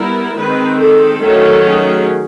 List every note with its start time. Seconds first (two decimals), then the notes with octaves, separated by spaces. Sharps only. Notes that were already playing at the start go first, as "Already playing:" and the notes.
Already playing: G3 B3 E4 A#4
0.36 D#3 G#3 C4 B4
0.79 A4
1.21 D#3 F#3 A3 C#4
1.62 G#4